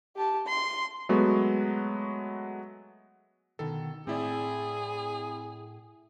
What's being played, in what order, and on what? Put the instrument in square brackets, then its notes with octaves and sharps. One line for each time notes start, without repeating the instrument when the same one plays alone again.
[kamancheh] G4 A5
C6
[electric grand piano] F#3 G#3 A3 B3 F#4
[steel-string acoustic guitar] B2 D3 D#3 [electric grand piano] A4
[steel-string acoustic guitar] A2 [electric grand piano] C4 E4 D5 [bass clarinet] G#4